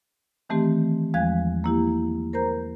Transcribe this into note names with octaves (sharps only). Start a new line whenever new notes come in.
D#3 E3 A3 C4 G4
E2 F3 G#3 F5 F#6 G#6
A#3 E4 G4
A#4 C5 A#5 G6